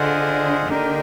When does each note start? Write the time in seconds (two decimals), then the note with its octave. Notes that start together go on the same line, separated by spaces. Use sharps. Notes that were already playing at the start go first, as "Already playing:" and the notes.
Already playing: D3 F4 G#4 C5 D#5 F#5
0.67 D3 A#3 D#4 G4 A#4